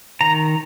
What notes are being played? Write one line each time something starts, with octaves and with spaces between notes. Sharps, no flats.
D#3 A#5